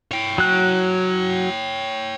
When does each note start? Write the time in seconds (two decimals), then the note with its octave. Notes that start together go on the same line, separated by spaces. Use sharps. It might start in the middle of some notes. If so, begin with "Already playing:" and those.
0.12 C#5 G5
0.38 F#3 F#6